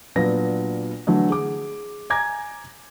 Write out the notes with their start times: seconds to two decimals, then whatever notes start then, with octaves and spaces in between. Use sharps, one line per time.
0.16 A#2 F#3 B3 D4 A#6
1.07 D3 E3 F#3 A3
1.30 G#4 D6
2.10 G#5 A#5 D6 G#6 A#6